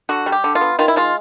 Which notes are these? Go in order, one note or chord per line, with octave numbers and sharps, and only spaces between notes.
D3 F#4
G3
G4
D3
F4
B3
D#3 F4
E4
G#3 F4